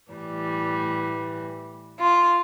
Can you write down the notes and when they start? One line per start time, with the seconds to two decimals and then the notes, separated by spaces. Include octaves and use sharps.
0.11 A2 E3 G3
2.00 F4